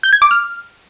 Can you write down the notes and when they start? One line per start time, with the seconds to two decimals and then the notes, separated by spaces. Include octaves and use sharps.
0.03 G6
0.13 G#6
0.22 D6
0.31 F6